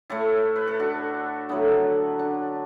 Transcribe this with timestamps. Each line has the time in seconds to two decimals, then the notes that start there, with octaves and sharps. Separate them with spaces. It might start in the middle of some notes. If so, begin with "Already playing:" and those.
0.10 A2 A3 E4 A4
0.56 B4
0.67 A4
0.79 D4 F#4
1.49 D3 F#3 A3 B3 E4
2.19 D4